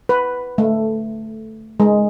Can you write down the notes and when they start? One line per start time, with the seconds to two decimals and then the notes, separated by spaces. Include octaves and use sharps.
0.09 B4
0.58 A3
1.80 G#3